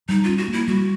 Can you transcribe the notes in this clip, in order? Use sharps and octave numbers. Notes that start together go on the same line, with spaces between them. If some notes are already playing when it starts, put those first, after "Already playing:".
G3 D#4
C#4 F4
F#4
A#3 E4
G3 F#4